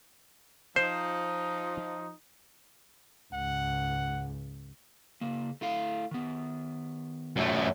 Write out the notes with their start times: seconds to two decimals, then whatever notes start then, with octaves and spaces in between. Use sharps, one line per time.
0.76 F3 D#4 C5
3.33 C#2 G#2 F#5
5.21 C#3 A#3
5.61 A3 E4 F5
6.11 D#3 B3
7.36 F#2 A3